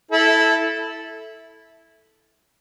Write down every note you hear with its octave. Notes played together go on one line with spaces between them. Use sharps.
E4 A4